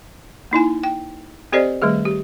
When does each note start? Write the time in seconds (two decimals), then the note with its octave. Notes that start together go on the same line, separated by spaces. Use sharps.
0.51 A#3 D#4 E4 G#5
0.83 G5
1.52 C4 G4 A4 C5 D5 D#5
1.82 D#3 G3 A3 G#4
2.05 G4